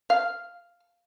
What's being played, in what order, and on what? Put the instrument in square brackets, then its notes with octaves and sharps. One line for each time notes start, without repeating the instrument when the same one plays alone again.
[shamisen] F5